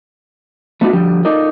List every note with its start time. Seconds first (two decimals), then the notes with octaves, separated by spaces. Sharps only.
0.81 A3 B3 D4 D#4 F4 F#4
0.93 D3 F3 G3 G4
1.25 D#4 F4 A4 A#4 D5 D#5